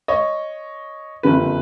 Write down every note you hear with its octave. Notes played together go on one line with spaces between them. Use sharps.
C#5 D#5
F#1 F2 D3 G3 B4